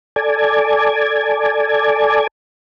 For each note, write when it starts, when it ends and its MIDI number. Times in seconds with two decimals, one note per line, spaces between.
0.16 2.27 69
0.16 2.27 74
0.16 2.27 80